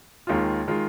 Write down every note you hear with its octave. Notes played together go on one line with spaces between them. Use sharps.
D#2 D#3 G#3 F4
D#3 G#3 F4